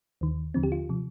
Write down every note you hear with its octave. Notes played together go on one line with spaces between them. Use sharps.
D#2 D#3
D#2 D3 F3 C4
G4
F4
C3 F3